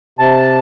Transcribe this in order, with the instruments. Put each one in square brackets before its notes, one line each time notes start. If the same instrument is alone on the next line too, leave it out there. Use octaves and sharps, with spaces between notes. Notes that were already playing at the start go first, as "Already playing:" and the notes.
[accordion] C3 A5